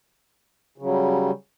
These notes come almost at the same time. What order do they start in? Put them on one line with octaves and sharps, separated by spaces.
C#3 F#3 G3